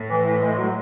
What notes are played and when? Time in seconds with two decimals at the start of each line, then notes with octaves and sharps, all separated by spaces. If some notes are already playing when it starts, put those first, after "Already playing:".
Already playing: A2
0.09 E3
0.25 E3
0.41 G#3
0.58 F#3